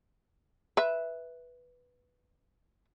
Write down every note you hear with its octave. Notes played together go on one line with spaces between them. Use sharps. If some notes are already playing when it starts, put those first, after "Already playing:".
B4 E5